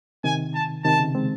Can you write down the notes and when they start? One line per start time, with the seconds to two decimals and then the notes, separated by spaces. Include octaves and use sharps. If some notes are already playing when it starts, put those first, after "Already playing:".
0.24 C3 D#3 G#5
0.54 A5
0.84 C3 D#3 A5
1.00 C#3
1.15 G#3 C4